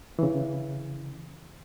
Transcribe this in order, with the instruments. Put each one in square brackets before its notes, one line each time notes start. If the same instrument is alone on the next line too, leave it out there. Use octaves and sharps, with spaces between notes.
[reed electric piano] C#3 E3